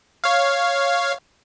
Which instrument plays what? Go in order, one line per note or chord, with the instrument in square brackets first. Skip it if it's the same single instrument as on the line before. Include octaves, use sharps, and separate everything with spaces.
[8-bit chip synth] C#5 F5